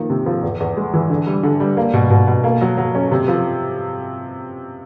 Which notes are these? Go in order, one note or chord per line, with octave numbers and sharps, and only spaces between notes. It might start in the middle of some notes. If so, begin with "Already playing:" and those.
Already playing: D#3 F3 A#3
C3
F3
E2
E2
G#3
E3
D3
G3
D3
G3
A#3
B2
B2
B2
A#3
F#3
F#3
C#4
C3
F3